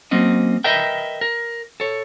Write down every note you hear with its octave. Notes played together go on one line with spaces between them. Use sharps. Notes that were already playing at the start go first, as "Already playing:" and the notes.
F#3 A#3 C4 C#4 D#5
A#4 B4 D#5 E5 G5
A#4
A4 C#5